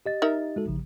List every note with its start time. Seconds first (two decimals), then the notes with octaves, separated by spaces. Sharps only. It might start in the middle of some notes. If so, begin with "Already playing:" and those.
0.06 G4 D#5 A6
0.22 D#4 A#4 E5
0.56 G#3 F#4 A4
0.68 A1 C#3 F3